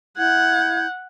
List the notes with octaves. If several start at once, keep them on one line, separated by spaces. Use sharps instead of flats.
E4 F#5 G6 G#6